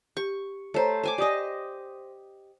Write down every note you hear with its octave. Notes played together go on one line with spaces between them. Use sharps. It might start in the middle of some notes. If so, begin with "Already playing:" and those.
G4 C#6
A3 C5 C#5 A#5
C5 G#5 D6
G4 D5 D#5 G#5 D#6